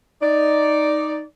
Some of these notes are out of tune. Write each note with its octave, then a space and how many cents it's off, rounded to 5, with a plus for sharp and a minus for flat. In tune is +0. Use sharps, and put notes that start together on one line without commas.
D#4 +0 D5 +0